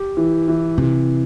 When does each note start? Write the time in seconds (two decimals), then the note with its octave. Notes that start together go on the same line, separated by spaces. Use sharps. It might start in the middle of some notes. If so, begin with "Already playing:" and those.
Already playing: G4
0.17 E3
0.48 E3
0.78 C3 E3